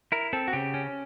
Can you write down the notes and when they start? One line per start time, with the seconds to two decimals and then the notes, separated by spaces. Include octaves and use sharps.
0.12 E4 A#4
0.33 C4 A4
0.48 F#4
0.53 C#3 G4
0.74 C#4